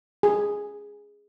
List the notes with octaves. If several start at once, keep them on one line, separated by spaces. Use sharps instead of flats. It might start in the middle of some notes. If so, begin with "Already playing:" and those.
G#4